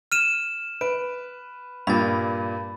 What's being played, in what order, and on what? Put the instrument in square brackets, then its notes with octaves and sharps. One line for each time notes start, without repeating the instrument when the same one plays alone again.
[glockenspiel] F6 D#7 E7
[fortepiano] B4 [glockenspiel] D7
[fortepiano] G2 A#2 [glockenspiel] B5 A6